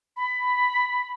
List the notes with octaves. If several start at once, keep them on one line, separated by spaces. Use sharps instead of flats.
B5